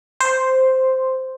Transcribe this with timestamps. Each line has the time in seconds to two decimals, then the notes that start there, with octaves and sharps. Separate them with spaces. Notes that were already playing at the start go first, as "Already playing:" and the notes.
0.21 C5